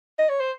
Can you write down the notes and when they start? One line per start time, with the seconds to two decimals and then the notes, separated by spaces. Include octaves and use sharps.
0.19 D#5
0.29 C#5
0.40 C5